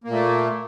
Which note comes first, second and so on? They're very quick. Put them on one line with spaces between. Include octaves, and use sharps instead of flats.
A#3 A#2 A3